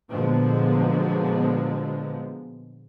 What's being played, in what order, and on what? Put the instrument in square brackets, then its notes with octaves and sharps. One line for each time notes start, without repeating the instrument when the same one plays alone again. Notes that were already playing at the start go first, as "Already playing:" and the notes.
[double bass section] A#2 D3 F3 F#3 G#3 B3